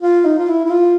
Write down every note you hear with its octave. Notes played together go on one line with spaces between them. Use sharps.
F4
D#4
F4
E4
E4
F4